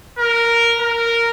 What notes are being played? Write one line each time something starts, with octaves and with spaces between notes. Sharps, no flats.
A#4
A#4